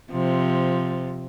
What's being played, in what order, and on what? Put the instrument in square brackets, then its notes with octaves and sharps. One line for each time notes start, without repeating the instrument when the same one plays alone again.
[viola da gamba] C3 F3